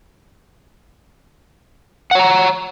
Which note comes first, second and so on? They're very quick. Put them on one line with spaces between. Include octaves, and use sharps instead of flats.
F#5 C#5 A#5